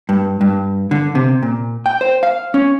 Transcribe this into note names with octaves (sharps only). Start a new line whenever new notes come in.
G2
G2
D3
C3
A#2
G5
C5
F5
C#4